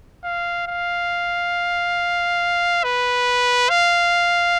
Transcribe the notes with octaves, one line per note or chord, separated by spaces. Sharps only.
F5
F5
B4
F5